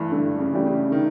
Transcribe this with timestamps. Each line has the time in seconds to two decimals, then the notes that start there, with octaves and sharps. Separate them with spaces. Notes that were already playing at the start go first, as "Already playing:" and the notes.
Already playing: G2 E3 A3 D4
0.12 G2 D3
0.39 C#3
0.53 E3 A3 D4 G4
0.66 C#3
0.92 D#3